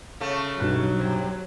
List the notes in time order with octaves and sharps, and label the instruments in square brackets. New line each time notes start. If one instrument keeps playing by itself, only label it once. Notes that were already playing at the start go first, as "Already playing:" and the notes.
[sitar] C#3 A3
[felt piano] B1 G2 F#6 [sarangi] F#3
[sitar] C3